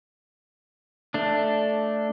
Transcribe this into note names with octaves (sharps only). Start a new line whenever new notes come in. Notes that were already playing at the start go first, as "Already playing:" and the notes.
A3 D4